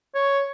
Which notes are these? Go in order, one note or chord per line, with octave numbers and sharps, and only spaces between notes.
C#5